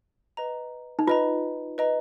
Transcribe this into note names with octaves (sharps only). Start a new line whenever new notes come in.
B4 D#5 A#5
D#4
F4 B4 D#5 A#5
B4 D#5 A#5